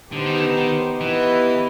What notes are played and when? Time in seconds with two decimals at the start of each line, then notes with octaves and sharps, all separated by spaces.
0.12 D3 B3 D#4 G4 C5
0.26 D#3
0.39 D3
0.57 D#3
1.00 E3 B3 E4 G4 B4 D#5